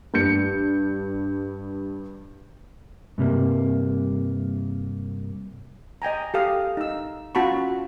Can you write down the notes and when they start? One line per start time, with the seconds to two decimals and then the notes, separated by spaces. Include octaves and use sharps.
0.14 G2 G6 C#7
3.18 G2 C3 G3 A#3
6.02 D#5 G5 G#5 A#5
6.34 G4 A4 F5 D#6
6.77 D#4 E6
7.35 C#4 F4 F#4 A5 B5 C#6